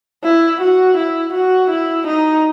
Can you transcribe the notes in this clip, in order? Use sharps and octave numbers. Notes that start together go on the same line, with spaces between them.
E4
F#4
E4
F#4
E4
D#4